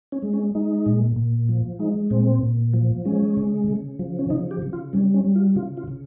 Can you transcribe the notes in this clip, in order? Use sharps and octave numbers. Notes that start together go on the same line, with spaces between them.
C#4
G#3
C#4
G#3 D#4
A#2
A#2
F3
G#3 D#4
A#2 C4
A#2
F3
G#3 C#4
C#3
C#3
F3
C#4
C#3 D#4
G4
C#3
F4
G3 C#4
C#4
G3
F4
C#3 F4
F4
C#3